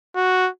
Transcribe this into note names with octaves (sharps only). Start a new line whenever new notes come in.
F#4